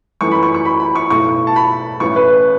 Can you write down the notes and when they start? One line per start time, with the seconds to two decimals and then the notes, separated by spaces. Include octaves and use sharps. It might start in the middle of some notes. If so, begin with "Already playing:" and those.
0.21 F#2 E3 A3 C#6
0.31 B5
0.43 C#6
0.54 C#6
0.65 B5
0.80 B5
0.95 C#6
1.10 B1 A2 A3 C#6
1.47 A5
1.56 B5
2.00 A1 A2 E3 C#6
2.16 B4